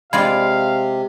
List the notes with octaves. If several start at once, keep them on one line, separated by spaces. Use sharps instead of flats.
C3 G#3 F4 D5 F5 B5 G#6 C7